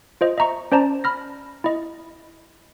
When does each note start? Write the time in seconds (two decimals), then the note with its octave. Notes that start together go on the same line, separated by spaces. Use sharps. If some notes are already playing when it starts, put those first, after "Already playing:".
0.21 F4 C5 D#5
0.37 D#5 E5 A#5 C#6
0.72 C#4 C5 D5 A5 A#5
1.04 B5 F6 A#6
1.64 E4 D#5